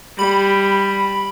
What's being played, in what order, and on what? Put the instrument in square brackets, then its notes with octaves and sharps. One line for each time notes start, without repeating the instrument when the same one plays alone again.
[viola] G3 [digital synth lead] B5